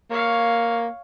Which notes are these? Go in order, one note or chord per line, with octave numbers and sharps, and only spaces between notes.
A#3 C#5 F5